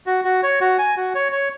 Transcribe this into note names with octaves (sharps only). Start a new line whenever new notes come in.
F#4
F#4
C#5
F#4
G#5
F#4
C#5
C#5